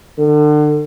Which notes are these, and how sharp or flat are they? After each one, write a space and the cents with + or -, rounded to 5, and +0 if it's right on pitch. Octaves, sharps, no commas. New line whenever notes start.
D3 +35